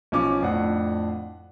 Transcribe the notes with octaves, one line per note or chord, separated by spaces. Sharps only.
B1 F3 C#4 D6
F2 A2 D4 F#5